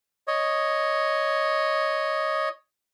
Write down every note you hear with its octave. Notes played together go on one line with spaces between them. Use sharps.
C#5 D#5